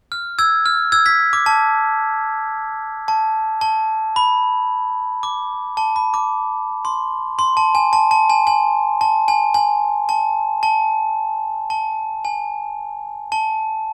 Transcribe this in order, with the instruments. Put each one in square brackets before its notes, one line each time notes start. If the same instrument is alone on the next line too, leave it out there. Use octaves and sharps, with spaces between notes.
[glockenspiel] F6
E6 G#6
F6
E6 G#6
G#6 B6
D6
A5
A5
A5
B5
D6
A5
B5
D6
C6
C6
A5
G#5
A5
A5
G#5
G#5
A5
G#5
G#5
A5
A5
A5
G#5
A5